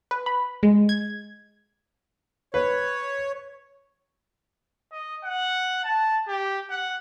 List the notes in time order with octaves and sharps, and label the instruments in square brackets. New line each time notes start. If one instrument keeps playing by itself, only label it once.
[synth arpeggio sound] B4
B5
G#3
G#6
[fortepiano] B4 [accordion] C#5
[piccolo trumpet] D#5
F#5
A5
G4
F#5